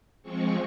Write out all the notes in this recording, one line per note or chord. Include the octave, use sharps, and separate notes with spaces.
F3 G#3 C4 C#6